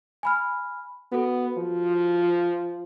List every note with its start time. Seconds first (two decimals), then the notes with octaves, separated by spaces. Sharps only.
0.23 G#5 B5 F6
1.12 B3 F#4 A4
1.58 F3